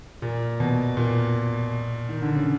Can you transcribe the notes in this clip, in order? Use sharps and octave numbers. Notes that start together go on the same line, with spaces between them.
A#2
B2
A#2
D#3
D3
C#3